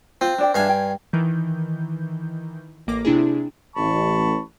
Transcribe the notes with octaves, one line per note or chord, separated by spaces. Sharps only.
C4 F4 C5
D4 D5 G5
G2 D4 G#4 E5 F5 G#5
G5
D#3 E3 G6
A1 A#3 D6 A#6
C3 D4 E4 G#4
A1 A5 B5 C#6